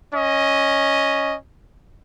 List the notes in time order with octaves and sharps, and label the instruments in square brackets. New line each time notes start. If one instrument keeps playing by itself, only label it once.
[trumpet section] C#4 D#5